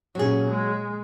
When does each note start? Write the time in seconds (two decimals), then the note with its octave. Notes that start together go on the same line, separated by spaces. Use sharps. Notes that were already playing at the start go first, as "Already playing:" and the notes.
0.15 A#2 F#3 C#4 G#4
0.49 G#3